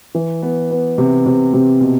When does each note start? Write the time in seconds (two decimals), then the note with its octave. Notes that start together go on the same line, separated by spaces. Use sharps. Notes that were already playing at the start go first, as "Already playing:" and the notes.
0.15 E3
0.42 B3
0.71 B3
0.98 C3
1.26 C3
1.53 C3
1.81 B2